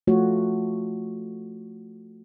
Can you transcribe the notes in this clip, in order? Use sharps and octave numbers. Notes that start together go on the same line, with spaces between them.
F3 A3 F4 F#4 C#5